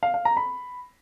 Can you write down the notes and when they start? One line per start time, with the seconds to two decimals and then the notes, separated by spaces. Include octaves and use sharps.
0.03 F5
0.14 F5
0.25 A#5
0.37 B5